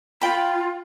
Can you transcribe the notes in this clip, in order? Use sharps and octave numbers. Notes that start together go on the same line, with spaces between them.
F4 G5 B5